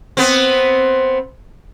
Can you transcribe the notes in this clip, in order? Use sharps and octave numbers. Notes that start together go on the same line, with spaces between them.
B3 C4